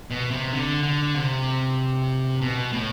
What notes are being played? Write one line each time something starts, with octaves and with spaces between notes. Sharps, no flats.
B2
C3
D3
D3
C3
B2
A2